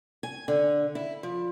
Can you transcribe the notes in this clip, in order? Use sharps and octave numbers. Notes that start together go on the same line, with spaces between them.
G#5
D3
E4
F3